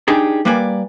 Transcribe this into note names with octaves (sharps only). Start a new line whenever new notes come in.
D4 D#4 G4 G#4
G3 A#3 B4 D5 G#5